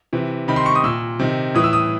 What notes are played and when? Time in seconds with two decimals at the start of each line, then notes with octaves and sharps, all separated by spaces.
0.13 C3 E3
0.48 C3 D#3 B5
0.56 C6
0.66 C#6
0.75 D#6
0.84 A#2 E6
1.19 C3 D#3
1.55 A2 E3 D#6
1.64 E6
1.73 D#6